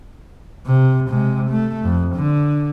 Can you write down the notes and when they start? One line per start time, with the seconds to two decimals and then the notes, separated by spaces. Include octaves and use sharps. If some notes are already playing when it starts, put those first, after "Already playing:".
0.66 C3
1.08 C3 G#3
1.49 A3
1.83 F2
2.15 D3